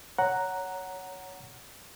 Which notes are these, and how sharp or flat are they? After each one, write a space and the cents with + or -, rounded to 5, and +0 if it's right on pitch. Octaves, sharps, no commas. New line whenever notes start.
C#5 +10 F#5 +0 A#5 +0